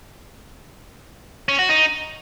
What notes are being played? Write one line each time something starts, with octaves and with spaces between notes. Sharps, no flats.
C#4
F#4
D#4